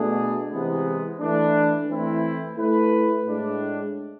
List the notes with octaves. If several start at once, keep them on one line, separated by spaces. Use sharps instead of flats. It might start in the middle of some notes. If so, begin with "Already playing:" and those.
Already playing: B2 A3 D4 G#4
C3 E3 G#3 B3
E3 A3 D4
E3 A3 C4 E4
A3 E4 B4
A2 G#3 D4